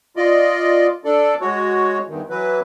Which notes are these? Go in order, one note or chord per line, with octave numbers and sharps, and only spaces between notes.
F4 D5 D#5
D4 A4 D5
G#3 F#4 C#5
E2 G2 D#3
E3 F#3 B4